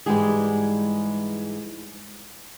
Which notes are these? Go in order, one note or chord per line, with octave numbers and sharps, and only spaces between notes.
G#2 E3 G3 G#3 G4 G#4